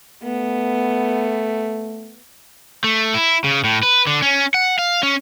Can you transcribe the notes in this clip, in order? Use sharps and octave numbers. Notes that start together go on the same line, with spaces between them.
A3 B3
A3
E4
C#3
A2
B4
D3
C#4
F#5
F5
C#4